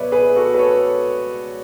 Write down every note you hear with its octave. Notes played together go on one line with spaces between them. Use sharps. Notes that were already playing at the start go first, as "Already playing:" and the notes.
Already playing: C#2 B2 F#3 B4 C#5 D5 E5
G#4 B4
F#4 A4
B4
A4 C#5